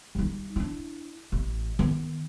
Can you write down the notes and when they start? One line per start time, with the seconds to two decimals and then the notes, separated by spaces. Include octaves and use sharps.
0.15 G3 D#4
0.56 D4 E4
1.32 A1
1.79 D#3 B3